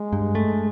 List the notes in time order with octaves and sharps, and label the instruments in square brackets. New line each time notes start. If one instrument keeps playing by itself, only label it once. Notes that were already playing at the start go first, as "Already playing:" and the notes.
Already playing: [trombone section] G#3
[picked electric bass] G2
A3